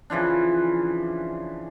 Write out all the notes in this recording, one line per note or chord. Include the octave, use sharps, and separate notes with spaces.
C#3 E3 F3 D4